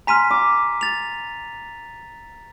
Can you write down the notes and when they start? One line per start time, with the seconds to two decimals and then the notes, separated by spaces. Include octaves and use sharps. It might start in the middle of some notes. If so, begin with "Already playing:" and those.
0.07 G#5 A#5 C6 F6 B6 D#7
0.31 D6
0.81 A6 F7